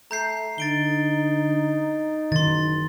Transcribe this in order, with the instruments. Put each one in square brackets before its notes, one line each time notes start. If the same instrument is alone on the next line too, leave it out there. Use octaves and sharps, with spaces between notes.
[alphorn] A3 [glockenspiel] A#5 G6 C7
[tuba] D3 [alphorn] D#4 [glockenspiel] A6 D7 G7
[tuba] F#1 [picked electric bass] D#3 [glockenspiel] C6 A6